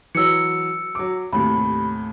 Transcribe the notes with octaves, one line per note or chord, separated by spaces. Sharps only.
E3 F#3 E6 C#7
F#3 D6
D#2 A2 C3 B5